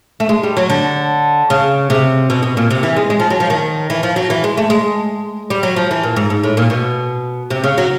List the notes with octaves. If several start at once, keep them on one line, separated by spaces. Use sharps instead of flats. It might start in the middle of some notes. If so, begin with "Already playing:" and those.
A3
G#3
G3
F#3
D3
C#3
C3
B2
B2
A#2
C3
E3
G#3
G#3
F3
F#3
F3
D#3
E3
F3
F#3
E3
G#3
A3
G#3
G3
F#3
F3
E3
A#2
G#2
G#2
A2
A#2
B2
C3
C#3
F#3